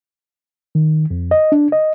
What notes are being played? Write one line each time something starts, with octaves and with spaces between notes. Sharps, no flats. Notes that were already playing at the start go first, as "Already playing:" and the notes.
D#3
F2
D#5
D4
D#5